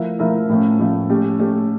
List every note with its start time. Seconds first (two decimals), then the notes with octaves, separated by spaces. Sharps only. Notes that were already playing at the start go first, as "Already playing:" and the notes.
Already playing: F3 A3 E4 A#4 E5
0.19 F3 A3 E4 A#4 E5
0.49 A2 F3 A3 C#4
0.79 A2 F3 A3 C#4
1.10 A3 C#4 G4
1.39 A3 C#4 G4